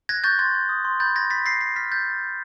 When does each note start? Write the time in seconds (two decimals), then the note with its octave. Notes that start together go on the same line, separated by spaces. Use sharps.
0.09 F#6 G#6 A#6
0.24 C#6 G6 A6
0.39 C6 G#6
0.54 C6
0.69 D#6
0.85 C6
1.00 B5 G6 A6
1.15 B5 G#6 A#6
1.30 B5 A6 B6
1.46 E6 A#6 C7
1.61 B5 A#6 C7
1.76 F6 A6 B6
1.91 B5 G6 A6